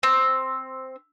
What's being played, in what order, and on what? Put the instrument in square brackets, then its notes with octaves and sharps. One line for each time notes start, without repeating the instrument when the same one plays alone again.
[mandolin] C4